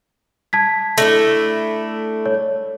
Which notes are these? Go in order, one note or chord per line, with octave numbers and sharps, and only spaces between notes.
A5 G#6 B6
A3 D4 E4 A#6 C#7
C#5